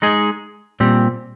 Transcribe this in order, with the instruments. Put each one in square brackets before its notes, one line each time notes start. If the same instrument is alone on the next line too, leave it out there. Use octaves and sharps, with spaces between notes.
[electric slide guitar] G#3 D#4 G#4
A#2 G3 C4 G4